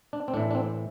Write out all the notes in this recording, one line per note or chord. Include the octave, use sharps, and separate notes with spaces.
D4
C4
A2 E3 D4
D4
C4